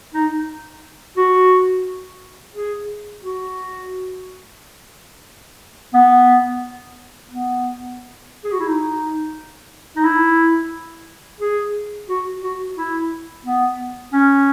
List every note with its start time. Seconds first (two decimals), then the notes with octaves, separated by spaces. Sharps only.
0.14 D#4
1.17 F#4
2.53 G#4
3.22 F#4
5.94 B3
7.31 B3
8.44 G#4
8.52 F#4
8.60 E4
8.67 D#4
9.96 D#4
10.04 E4
11.40 G#4
12.09 F#4
12.43 F#4
12.77 E4
13.46 B3
14.13 C#4